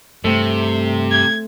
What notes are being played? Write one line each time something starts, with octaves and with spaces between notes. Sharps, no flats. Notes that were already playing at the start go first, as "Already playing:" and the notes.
G2 C3 A3 C4
G#6